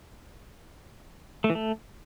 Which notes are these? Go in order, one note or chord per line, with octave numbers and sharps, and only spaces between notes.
A3
E3
A3